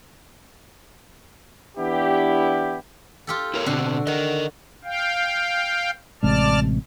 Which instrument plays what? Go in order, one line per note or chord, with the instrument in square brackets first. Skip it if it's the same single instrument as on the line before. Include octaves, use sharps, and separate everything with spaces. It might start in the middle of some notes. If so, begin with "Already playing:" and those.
[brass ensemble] E3 B3 D4 E4 G4
[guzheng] F4 G4 A4
[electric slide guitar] E4 A#4 C#5
[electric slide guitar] B2 C4 [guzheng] D3 F#4
[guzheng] F#4 [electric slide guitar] A#4 D#5
[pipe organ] F5 G5
[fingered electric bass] A1 C3 G#3 [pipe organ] D5 A5 F6